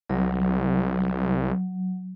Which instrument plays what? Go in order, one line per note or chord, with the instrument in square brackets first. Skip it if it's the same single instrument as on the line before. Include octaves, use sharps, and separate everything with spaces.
[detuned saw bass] C2 [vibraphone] F#3